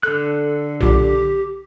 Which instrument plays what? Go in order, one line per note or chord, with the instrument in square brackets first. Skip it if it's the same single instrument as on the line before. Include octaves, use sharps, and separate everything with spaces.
[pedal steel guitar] D3 F#6 [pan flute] A4
[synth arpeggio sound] B1 A#2 [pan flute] G4